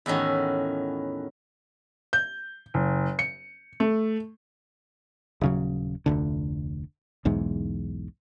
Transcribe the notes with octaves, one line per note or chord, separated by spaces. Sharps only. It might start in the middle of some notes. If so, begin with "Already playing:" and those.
E2 A2 D#3 C#4 F#4
G6
F#1
C#7
A3
D#1 C#3 F#3
F1 D2 D3
B1 E2 G#2